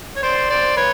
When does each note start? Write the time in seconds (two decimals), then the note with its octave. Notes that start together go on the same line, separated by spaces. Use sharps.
0.17 C#5
0.23 C5 D5
0.50 C5 D5
0.76 B4 C#5